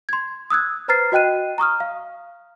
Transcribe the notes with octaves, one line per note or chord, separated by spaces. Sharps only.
C6 G#6
D#6 E6 F#6 G#6
B4 C5 A#5 F6 A6 C7
F#4 D#5 G5 F#6 D#7
A#5 C#6 D#6 F6
F5